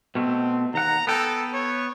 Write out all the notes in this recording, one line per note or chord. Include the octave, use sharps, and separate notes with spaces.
B2 A3 C4
D#2 F#5 A#5
B3 A4 G5
C#5